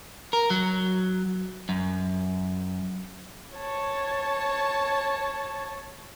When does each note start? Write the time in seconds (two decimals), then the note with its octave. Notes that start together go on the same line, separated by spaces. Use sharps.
0.33 A#4
0.50 F#3
1.69 F#2
3.56 C#5 A5